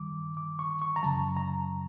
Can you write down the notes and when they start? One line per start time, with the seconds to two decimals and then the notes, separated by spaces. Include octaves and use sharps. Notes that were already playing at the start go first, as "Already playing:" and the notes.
Already playing: G2 D#3 G3 D6
0.37 D6
0.59 C#6
0.82 C#6
0.96 A#5
1.03 F#2 C#3 F#3 A5
1.37 A#5